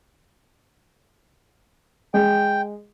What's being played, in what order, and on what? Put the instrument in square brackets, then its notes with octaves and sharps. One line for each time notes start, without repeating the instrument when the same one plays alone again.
[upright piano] G#3 [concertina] G5